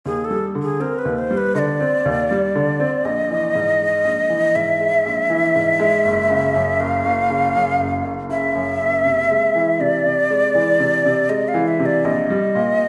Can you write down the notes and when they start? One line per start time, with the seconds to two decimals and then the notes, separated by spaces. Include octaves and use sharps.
0.06 D#2 G#4
0.24 A4
0.31 G3
0.55 D3
0.62 G#4
0.80 C4 A#4
0.98 B4
1.05 D#2
1.18 C5
1.31 G3
1.37 B4
1.55 D3 D#5
1.58 D5
1.80 C4
2.05 D#2
2.31 G3
2.55 D3
2.80 C4
3.05 A#1 D#5
3.31 E3
3.55 G#2
3.80 G#3
4.05 A#1
4.30 E3
4.55 G#2 E5
4.80 G#3
5.06 A#1
5.30 E3
5.56 G#2
5.80 G#3
6.05 F#1
6.30 C#3
6.56 F#2
6.80 F#1 F5
7.05 F#1
7.30 C#3
7.56 F#2
7.80 F#1
8.04 F#1
8.29 C#3 E5
8.55 F#2
8.80 F#1
9.05 C3
9.30 G#3
9.55 E3
9.80 C3 D5
10.05 C3
10.30 G#3
10.55 E3
10.80 C3
11.05 C3
11.29 G#3 D#5
11.48 F5
11.54 E3
11.68 E5
11.79 C3
11.85 D5
12.05 A#1 D#5
12.30 G3
12.55 A#2